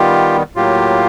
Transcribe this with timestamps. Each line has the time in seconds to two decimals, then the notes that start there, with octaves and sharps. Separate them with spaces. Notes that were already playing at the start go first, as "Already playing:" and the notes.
Already playing: D#3 G3 B3 F4 G4
0.56 A2 F#3 A#3 F4 G4